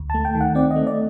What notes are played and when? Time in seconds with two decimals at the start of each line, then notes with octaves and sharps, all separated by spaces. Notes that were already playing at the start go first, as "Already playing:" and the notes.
Already playing: D2
0.10 A3 A5
0.25 G5
0.35 D#3
0.41 F#5
0.55 C4 D5
0.71 D#5
0.76 A3
0.87 D5